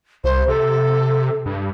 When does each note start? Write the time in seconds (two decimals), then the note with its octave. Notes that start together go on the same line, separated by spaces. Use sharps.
0.24 C2 C5
0.48 C3 A4
1.46 G2